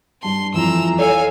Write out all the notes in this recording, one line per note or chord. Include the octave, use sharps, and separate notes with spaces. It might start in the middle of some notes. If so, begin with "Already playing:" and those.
G2 A5 C6
F2 E3 A#5 E6
A4 C#5 F5 G#5